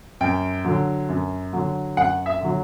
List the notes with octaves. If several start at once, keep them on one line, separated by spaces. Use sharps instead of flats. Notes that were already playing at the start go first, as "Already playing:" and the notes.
F#2 G5
D3 F#3
F#2
D3 F#3
F#2 F#5
E5
D3 F#3